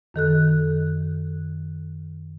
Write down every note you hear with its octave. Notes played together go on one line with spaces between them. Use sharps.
F#2 D#3 A4 F#6